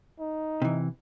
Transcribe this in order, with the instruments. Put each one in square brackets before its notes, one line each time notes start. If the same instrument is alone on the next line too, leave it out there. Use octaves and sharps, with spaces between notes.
[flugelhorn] D#4
[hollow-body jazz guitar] C3 E3